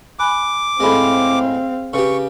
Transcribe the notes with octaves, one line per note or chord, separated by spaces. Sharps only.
G#5 B5 D6 F#6
A2 G#3 C4 G#4 C5 F5 B5
C#3 G4 B4 C#6